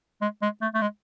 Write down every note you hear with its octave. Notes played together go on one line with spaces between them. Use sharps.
G#3
G#3
A3
A3
G#3